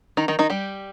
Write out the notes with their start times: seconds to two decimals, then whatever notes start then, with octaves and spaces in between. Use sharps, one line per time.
0.17 D#3 D#4
0.28 D#3 D#4
0.39 D#3 D#4
0.50 G3 G4